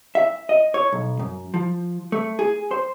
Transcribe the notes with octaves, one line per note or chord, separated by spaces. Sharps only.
E5
D#5
C#5
B1
F#2
F3
A3
G#4
C5